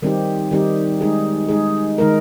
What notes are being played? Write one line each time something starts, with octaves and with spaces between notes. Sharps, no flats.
D#3 G3 C4 D#4 G4
D#3 G3 C4 D#4 G4
G#3 D#4 G#4
G#3 D#4 G#4
D#3 G#3 D#4 A#4